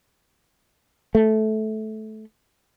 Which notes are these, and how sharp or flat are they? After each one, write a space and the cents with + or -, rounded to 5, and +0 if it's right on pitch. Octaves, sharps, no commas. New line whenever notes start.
A3 -15